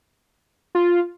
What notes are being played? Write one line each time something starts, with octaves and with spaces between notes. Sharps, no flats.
F4